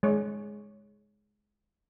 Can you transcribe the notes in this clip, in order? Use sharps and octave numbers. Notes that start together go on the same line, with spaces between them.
G#3 C#5